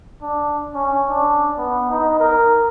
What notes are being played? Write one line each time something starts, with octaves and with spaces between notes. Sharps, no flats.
D4
C#4
D4
B3
D#4
A#4